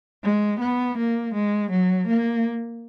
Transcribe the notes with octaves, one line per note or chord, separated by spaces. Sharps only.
G#3
B3
A#3
G#3
F#3
A#3